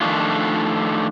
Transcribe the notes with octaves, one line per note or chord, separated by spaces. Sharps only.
D#3 F3 A3 D4 F4